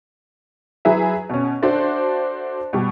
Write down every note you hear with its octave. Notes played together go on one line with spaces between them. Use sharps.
F#3 E4 G#4 B4 E5
B2 C#4
D4 F#4 A4 C5 D5 E5
B2 G3